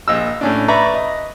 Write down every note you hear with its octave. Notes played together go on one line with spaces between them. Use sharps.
A#1 D#5 E6
A2 C#4 D4
B4 D5 E5 A#5 B5 C#6
D#5